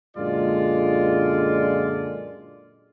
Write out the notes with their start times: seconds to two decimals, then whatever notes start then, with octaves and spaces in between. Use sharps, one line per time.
0.17 F#2 A#2 D3 G#3 F4 D5